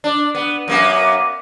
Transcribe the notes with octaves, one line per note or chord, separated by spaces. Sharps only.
D4
B3
F#2 A#3 B3